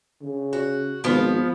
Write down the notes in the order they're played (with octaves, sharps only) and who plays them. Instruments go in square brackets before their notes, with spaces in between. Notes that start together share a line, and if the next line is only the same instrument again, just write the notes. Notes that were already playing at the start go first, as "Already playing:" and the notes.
[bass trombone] C#3
[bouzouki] F#4
[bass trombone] G#1 [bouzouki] F3 B3